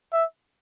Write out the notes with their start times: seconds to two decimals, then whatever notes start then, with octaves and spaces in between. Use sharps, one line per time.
0.12 E5